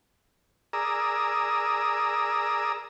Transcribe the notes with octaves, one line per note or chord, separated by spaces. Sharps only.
G#4 A#4 D5 A#5 D#6 E6